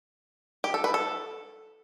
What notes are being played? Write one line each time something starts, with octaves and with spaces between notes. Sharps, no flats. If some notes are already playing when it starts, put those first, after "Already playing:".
G4
A4
B4
A4